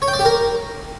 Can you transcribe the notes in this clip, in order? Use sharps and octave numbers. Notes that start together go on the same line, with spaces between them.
C#5
G5
D5
G4
A#4